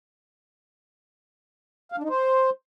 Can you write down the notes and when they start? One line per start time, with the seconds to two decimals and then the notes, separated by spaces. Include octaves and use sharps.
1.92 F5
1.98 D4
2.03 D#4
2.09 C5